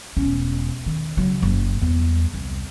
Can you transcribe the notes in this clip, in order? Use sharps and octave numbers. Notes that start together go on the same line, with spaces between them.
E1 C#4
D#3
C#3 F#3
F#1
E2 G3
C2